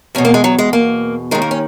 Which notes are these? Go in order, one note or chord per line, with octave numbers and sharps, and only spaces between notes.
E2 B2 C#4
A#3
G#3
F#3
G#3
A#3
D#2 D#3 G#3
A#3
C#4